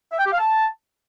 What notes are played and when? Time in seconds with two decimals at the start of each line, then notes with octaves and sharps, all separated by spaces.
0.11 E5
0.18 G5
0.25 G4
0.32 F5
0.38 A5